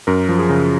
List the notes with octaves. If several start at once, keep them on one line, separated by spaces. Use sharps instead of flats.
F#2 A#4
F3
G#4
C#3